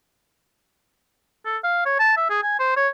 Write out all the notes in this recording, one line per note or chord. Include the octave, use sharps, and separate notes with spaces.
A4
F5
C#5
A5
E5
G#4
G#5
C5
C#5